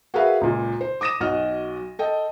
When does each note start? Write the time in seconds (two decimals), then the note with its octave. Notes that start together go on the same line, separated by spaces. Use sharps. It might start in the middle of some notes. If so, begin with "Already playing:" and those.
0.14 F#4 G#4 A#4 B4 E5 F5
0.41 C#2 A#2
0.81 C5
1.01 D6 D#6 A#6 D#7 E7
1.20 B1 F#4 D#5 F6
1.99 A4 D#5 G5